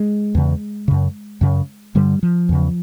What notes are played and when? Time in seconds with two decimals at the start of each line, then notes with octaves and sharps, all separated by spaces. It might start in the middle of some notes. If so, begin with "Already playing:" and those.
Already playing: G#3
0.35 E2 C#3
0.88 F#2 C#3
1.41 F#2 C#3
1.95 G2 D3 G3
2.23 F3
2.49 E2 C#3